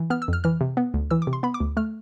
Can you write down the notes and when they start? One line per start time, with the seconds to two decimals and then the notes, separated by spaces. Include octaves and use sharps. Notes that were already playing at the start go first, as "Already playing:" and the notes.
Already playing: E3
0.10 B3 F6
0.22 E6
0.28 F2 F6
0.44 E3 F6
0.61 C3
0.77 B3
0.94 D2
1.11 E3 E6
1.22 D6
1.27 C3
1.33 C6
1.43 B3 B5
1.54 D6
1.60 D2
1.77 A3 F6